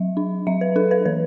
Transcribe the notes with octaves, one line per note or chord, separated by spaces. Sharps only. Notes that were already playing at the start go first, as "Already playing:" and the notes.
Already playing: F#3 E5
D4
F#3 E5
B4
D4 A4
B4
E3 B4